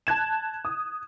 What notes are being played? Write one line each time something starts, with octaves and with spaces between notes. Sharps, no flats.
A5 F#6 G#6 E7
D#6